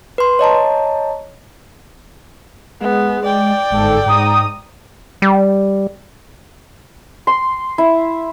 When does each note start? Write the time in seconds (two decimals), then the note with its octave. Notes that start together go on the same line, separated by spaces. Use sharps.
0.18 B4 C6
0.39 C#5 D#5 A5 A#5
2.81 G#3 B3
3.24 D5 G5
3.70 G1 G#2 A4
4.06 G#2 A#5 D#6
5.22 G3
7.27 C6
7.78 E4